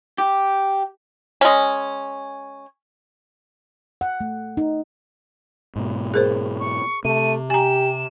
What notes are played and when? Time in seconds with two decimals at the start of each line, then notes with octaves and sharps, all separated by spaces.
0.18 G4
1.41 G#3 C#4
4.01 F#5
4.21 A3
4.57 D#4
5.76 G#2 B2
6.14 G#4 A#4 C5
6.60 C#6
7.05 C3 A3 D#7
7.50 G4 G#5 A#5 E7